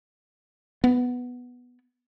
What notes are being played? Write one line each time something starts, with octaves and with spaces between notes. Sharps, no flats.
B3